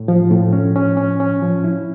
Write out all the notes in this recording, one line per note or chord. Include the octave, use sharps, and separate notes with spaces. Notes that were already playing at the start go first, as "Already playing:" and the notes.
Already playing: A2
F3
A2
C#4
C#4
C#4
C#4
F3
E4